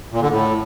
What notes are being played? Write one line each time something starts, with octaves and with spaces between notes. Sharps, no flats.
A#2
D3
A2